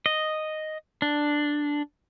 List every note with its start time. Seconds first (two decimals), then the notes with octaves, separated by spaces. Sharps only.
0.06 D#5
1.02 D4